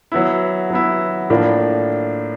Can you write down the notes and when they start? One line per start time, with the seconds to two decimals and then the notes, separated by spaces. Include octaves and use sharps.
0.12 F#3 B3 E4
0.70 F#3 B3 E4
1.30 A2 F3 A#3 D4